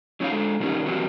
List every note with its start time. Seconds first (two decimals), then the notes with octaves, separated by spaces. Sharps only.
0.20 F#3 C#4 D#4 C#5 F5
0.32 G#3 D4 A4
0.60 C3 D#3 G3 A#3 C#4 D#4
0.86 E3 F#3 G3 A#3 C4 F#4